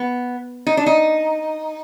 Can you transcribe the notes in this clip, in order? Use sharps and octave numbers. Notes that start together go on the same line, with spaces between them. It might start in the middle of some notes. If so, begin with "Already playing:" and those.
Already playing: B3
D#4
D4
D#4